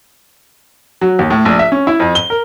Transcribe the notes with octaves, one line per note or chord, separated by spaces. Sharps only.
F#3
D#2
A2
A#1
E5
C#4
E4
F2
G7
A#4